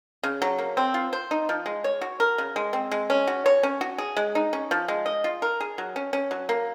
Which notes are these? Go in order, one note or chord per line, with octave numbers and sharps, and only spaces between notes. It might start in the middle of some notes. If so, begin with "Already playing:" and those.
C#3
F#3
A#3
C4
F4
C5
D#4
F3
G#3
C#5
F#4
A#4
C#3
G#3
C4
G#3
C#4
F#4
C#5
C#4
F#4
G#4
G#3
D#4
C#4
F3
G#3
D#5
F4
A#4
G#4
F#3
C#4
C#4
F#3
A#3